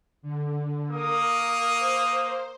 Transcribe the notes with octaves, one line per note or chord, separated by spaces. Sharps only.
D3
A#3 A#4 D#6
C5